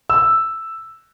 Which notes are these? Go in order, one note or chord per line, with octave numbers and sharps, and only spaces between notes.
E6